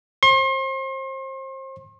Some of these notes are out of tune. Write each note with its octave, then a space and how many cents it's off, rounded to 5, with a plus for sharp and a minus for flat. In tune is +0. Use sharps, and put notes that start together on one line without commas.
C5 +30 C6 +40